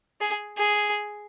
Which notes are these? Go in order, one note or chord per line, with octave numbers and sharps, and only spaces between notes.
G#4
G#4